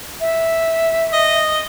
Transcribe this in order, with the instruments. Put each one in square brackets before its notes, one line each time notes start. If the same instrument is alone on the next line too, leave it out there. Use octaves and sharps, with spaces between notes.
[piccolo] E5
[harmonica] D#5